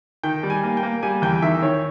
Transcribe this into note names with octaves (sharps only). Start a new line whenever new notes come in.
D#3 G5
G3
G#5
A#3
G5
A#3
G3 G#5
E2 G5
D#3 E5
D#3 C#5